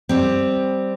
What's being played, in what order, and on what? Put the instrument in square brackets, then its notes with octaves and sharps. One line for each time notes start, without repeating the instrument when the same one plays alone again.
[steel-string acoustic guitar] G3 C4